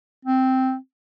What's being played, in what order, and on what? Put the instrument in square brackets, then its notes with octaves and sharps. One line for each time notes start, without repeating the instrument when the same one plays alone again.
[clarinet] C4